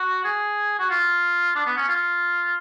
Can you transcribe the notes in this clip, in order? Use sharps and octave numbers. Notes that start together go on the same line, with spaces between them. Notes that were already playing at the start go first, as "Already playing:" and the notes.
Already playing: F#4
G#4
F#4
F4
D4
B3
C#4
F4